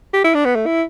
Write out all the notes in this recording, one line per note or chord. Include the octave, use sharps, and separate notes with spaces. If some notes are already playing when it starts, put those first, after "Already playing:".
G4
E4
D4
B3
A3
E4